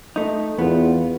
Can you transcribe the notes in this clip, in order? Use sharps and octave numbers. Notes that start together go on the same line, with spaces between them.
A3 D#4
E2 B3 F4